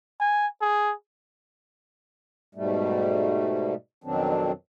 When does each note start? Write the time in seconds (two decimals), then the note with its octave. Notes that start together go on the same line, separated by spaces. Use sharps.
0.20 G#5
0.61 G#4
2.55 G#2 B2 G3 A3
4.04 F2 B2 D#3 F#3 C4 D4